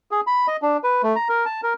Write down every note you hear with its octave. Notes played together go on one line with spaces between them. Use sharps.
G#4
B5
D#5
D4
B4
A3
A#5
A#4
A5
A#4